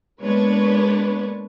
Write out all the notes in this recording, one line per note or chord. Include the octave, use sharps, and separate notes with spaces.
G#3 A#3 B3 D4 B4 C#5